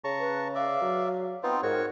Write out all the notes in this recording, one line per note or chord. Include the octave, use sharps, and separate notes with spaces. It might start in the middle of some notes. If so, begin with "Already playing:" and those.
C#3 A5 A#5 C#6
B4
D5 E5 F5
F#3
B3 C4 D#4 F4 G5
G#2 F#4 A#4 C#5 C#6